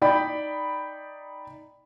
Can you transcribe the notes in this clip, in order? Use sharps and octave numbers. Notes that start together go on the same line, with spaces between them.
D#4 D5 G5 B5